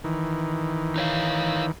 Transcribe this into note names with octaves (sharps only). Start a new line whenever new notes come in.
D#3 E3
D#4 C#5 F5